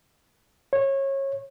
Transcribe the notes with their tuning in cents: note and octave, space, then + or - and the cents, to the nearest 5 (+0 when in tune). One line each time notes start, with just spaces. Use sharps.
C#5 -25